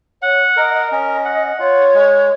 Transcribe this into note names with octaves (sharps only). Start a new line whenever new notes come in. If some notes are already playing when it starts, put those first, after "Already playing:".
C#5 F#5
A#4 D#5
D#5
C#4 D#5
F#5
F4 C#5
G#3